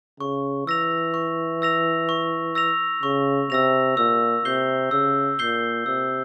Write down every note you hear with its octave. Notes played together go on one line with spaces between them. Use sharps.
C#3 C#6
E3 E6 A#6 F7
C#6
E6 A#6 F7
C#6
E6 A#6 F7
C#3 C#6
C3 E6 A#6 F7
A#2 E6
C3 G6 C7 G7
C#3 E6
A#2 G6 C7 G7
C3 E6